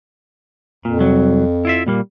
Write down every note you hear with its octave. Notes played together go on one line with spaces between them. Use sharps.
F2 A#2
C2 F#3
E4 F4 E5
A#2 G3 A#3